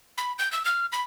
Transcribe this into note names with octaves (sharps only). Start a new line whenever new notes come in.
B5
G6
E6
F6
B5